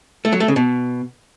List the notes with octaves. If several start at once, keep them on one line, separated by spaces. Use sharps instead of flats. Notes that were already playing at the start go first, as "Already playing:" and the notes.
A3
F#3
A3
C#3
B2